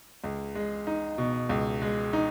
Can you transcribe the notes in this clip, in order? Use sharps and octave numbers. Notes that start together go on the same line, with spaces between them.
C#2
G#3
D#4
B2
C#2
G#3
D#4